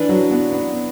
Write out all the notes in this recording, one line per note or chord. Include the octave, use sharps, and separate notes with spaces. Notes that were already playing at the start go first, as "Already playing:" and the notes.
Already playing: E3 D4 B4
F#3
B3
B3